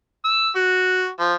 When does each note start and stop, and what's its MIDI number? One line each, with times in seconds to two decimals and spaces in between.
0.25 0.50 88
0.56 1.09 66
1.20 1.33 53